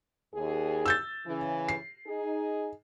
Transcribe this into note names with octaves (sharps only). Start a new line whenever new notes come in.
D#2 G#4
E6 G6 A6
C#3 E3
C7
D#4 G#4